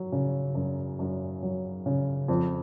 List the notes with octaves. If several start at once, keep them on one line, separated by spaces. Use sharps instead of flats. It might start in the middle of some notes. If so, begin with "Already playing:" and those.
Already playing: F#3
C#3
F#2
F#2
F#3
C#3
F2